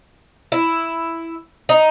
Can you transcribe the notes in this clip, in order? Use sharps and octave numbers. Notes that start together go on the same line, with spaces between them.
E4
D#4